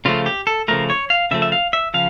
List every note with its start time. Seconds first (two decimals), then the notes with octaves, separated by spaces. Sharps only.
0.05 C#3 F3 A3 F4
0.26 G4
0.47 A4
0.68 C#3 F3 A3 A#4
0.90 C#5
1.10 F5
1.31 C#3 F3 A3 E5
1.42 E5
1.52 F5
1.73 E5
1.94 C#3 F3 F5